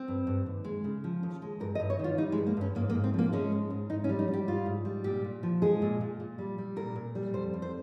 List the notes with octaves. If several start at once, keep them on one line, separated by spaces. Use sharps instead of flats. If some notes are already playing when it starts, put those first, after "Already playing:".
Already playing: C4
G2
G2
D#2
G#3
C#3
F3
D#2
G#3
G2 A#4
D#5
G2
C#5
D#3
F4
G3 D#4
G#3
G2
A#3
G2 C#4
G#2 A#3
A#3
G#2
C4
F3 A#3
G#3 C#4
G#2
G#2
G#2 D#4
C#4
G3
D#4
G3
G4
G#2 F4
G#2
G3
A#2 G4
A#2
F3
G#3 G#4
A#2
A#2
A#2
G3
G3
A#2 A#4
A#2
G3
F2 C5
F2
C5